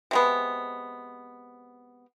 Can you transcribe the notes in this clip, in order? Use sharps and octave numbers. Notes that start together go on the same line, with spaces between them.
C3 G#3 B3